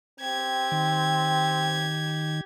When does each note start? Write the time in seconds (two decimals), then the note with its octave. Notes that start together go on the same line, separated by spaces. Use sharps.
0.20 C4 G4 G#6
0.72 D#3